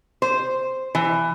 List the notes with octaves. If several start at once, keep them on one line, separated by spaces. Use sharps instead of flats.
C5
E3